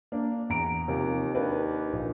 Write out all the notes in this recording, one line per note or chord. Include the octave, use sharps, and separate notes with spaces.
A#3 D4
E2 A#5 D7
D#2 C3 F3
D#2 D4 B4
A#1